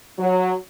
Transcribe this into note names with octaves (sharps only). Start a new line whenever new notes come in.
F#3